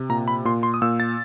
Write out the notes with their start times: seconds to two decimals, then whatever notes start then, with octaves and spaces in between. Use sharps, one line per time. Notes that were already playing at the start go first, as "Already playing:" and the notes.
Already playing: C3
0.09 A#2 A#5
0.28 B5
0.45 A#2 C6
0.63 C6
0.74 D#6
0.82 A#2 E6
1.00 A6